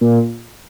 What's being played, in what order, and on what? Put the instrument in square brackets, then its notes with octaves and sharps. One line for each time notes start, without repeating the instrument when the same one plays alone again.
[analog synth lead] A#2